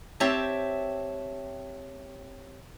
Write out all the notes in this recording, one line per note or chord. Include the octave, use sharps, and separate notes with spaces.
C4 G4 C#5 E5 A5